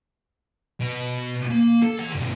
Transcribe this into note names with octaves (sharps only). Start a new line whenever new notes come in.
B2
A#3
A4
E3 F#5
G2 B2